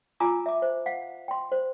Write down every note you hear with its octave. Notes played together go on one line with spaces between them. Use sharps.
F4 G#5 A#5 D6 E6
E5 D6
C5
F5 F#5
G5 C6
C5